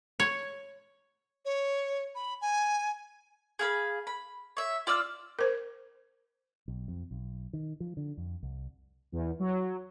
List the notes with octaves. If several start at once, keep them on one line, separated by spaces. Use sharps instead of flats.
C#5
C#5
B5
G#5
G#4 F5 B5
B5
C#5 E5
F4 D5 E6 F6
A#4 C5
B1
F2
B1
D#3
F3
D3
F2
C2
E2
F#3